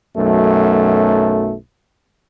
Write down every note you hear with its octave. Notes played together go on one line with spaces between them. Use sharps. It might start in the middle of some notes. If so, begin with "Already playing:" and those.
B1 F#2 A3